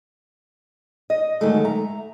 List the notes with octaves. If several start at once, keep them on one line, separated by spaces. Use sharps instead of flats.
D#5
G#2 D3 D#3 F#3 G#3 A3
E5 A#5